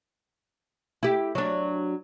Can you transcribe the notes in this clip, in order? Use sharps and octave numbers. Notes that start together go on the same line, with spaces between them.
E4 G4
F#3 D4